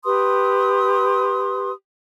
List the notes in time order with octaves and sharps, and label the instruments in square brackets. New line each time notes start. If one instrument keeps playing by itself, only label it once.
[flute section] G4 B4 C6 D#6